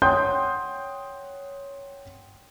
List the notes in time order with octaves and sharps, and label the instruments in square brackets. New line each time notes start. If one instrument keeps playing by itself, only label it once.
[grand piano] C#5 F#5 G5 C6 D#6 G6